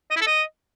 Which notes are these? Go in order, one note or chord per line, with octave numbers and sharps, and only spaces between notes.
D#5
E4
A4
D#5